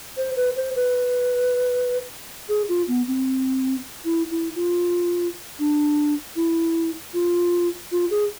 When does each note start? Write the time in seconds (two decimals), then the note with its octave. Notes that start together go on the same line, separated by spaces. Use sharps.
0.17 C5
0.37 B4
0.57 C5
0.76 B4
2.49 G#4
2.69 F4
2.88 B3
3.07 C4
4.05 E4
4.31 E4
4.55 F4
5.60 D4
6.36 E4
7.14 F4
7.92 F4
8.11 G#4